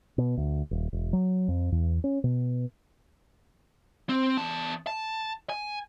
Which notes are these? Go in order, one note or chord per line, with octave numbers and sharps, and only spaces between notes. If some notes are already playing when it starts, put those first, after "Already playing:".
B2
D2
D#1
E1
F#3
F2
E2
C#4
B2
C4
E2 A5
A5
G#5